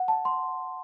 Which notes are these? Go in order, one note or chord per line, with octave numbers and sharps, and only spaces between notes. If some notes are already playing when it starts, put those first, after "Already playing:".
Already playing: F#5
A5
C6